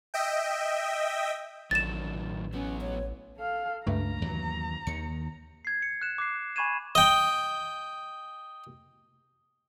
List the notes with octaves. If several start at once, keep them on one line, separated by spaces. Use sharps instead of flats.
D#5 E5 G5
A1 D#3 F#3 D4 A6 E7
F#3 B3 C#4
C#5
A4 F5
C#2 G2 A3 A#5
D#2 E3 F#3
D#2 D#3 C#7
G#6 C7
C#7
F#6 E7
D6 F#6 C7
G#5 B5 C#6 G#6 D#7 E7
D#5 G5